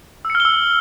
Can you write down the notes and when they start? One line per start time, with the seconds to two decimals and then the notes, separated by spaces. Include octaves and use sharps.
0.25 E6
0.30 C#7
0.35 F6
0.40 G7
0.45 E6